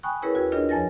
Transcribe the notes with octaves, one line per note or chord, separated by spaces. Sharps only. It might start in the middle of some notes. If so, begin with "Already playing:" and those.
G5 G#5 B5 C#6 D#6 F#6
C#4 E4 G#4 A#4 B4 C#5
D#2 F#4 B4 E6 G#6
D4 F4 G#4 A#4 C#5 D#5
F2 F3 C#5 G#5 A6 A#6